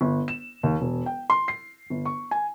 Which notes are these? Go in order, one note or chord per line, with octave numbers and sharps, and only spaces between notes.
G1
E7
D#2
E1
G5
C6
C7
G1
C#6
G#5